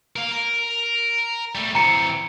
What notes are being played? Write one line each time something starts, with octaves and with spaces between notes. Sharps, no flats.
A#4 F5
A#4
G3 A3
E3 C4 A#5 C#7